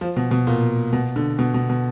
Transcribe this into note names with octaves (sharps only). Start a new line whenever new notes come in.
F3
B2
B2
A#2
B2
D3
B2
B2
B2